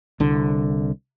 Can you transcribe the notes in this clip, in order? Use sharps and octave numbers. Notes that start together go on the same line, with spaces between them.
C2 D3